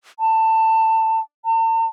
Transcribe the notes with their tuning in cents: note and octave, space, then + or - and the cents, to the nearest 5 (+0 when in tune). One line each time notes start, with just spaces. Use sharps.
A5 +20
A5 +45